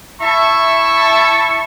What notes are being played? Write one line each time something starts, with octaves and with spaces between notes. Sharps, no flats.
E4 E5 A5 C#6